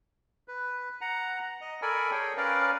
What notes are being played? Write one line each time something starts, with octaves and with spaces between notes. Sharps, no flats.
B4
F#5 A#5
D#5
A4 A#4 D5 G#5 B5
G#4 C#5 G5
C#4 A#4 B4 D5 F5